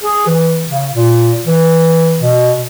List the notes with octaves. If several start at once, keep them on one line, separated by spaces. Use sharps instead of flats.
G#4
E3
C#3
A#2
E3
B2